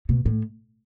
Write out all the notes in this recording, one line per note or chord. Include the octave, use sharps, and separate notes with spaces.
B2
A2